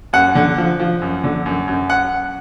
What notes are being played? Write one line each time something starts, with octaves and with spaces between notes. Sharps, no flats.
F#2 F#5
D3
F3
F3
F#2
D3
F#2
F#2
F#5